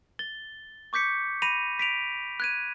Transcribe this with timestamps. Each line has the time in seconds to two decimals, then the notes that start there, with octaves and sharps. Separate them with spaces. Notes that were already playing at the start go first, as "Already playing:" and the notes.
0.19 A6 G7
0.93 C#6 D6 G6 B6 C#7
1.42 B5 A#6 C7 D#7 F7
1.79 B6 D7 F7
2.40 F#6 G#6 D#7